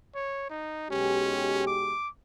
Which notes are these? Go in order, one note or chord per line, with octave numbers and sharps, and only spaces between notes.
C#5
D#4
B1 G#3 C#4 G4
D6